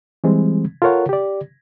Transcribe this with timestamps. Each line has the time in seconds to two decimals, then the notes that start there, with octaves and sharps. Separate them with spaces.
0.24 E3 G3 G#3 C4
0.82 F4 A4 A#4 C#5 F#5
1.09 G4 D5